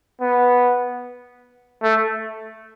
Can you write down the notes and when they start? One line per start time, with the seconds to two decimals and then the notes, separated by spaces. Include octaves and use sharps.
0.21 B3
1.82 A3